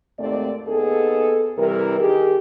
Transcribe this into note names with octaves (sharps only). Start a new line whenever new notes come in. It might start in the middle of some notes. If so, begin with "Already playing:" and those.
D#2 G#2 A3 C4 D5
D#2 B3 D#4 G#4 A4
C3 E3 G3 E4 A#4
D#3 G4 G#4